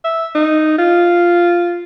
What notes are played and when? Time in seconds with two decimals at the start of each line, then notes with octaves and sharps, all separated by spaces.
0.04 E5
0.35 D#4
0.78 F4